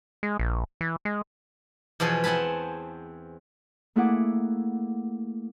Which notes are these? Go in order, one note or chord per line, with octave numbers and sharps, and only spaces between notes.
G#3
A#1
E3
G#3
E2 B2 F3 F4 G#4
C4 F#5 G#5 A5 B5
A3 A#3 E4 G#4 F#5 D6